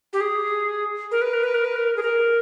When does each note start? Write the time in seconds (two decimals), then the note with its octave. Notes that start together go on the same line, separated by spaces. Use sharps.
0.13 G4
0.21 G#4
1.11 A#4
1.22 B4
1.33 A#4
1.43 B4
1.54 A#4
1.64 B4
1.76 A#4
1.96 G#4
2.02 A#4